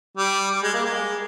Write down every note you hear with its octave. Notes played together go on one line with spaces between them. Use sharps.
G3
G3
G#3
A#3
G#3